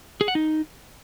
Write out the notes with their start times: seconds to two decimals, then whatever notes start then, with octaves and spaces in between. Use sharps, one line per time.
0.21 G#4
0.28 F#5
0.35 D#4